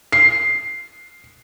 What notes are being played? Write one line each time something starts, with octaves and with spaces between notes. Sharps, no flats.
C7